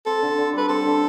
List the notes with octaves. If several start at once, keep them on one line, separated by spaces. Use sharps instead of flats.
C4 A4
D3
D3
G3 B4
C4 A4
D3